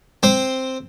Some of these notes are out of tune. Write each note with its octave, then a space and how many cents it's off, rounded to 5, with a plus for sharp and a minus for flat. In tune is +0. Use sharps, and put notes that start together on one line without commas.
C4 +0 C5 +0